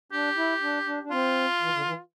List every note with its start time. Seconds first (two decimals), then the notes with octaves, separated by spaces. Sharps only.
0.12 D4 G4
0.37 E4
0.61 D4
0.86 D4
1.03 D4
1.11 C4 F4
1.61 E3
1.73 D3
1.85 E3